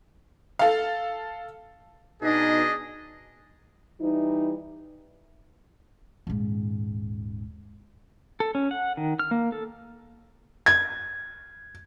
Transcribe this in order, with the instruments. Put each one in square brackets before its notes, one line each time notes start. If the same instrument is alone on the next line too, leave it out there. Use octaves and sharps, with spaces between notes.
[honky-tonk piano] A4 F5
[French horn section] B2 D#4 [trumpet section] D4 G#4 D#5
[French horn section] E3 G3 D#4
[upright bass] D#1 G#2
[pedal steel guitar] A4
C#4
F#5
D#3
F6
A#3
A4
[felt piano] G#6